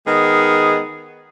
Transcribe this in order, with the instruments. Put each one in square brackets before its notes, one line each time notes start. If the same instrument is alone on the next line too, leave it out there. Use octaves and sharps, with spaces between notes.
[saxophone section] D#3 G#3 B3 G#4